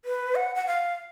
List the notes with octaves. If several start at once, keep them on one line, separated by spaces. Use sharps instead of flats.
B4
F#5
F#5
F5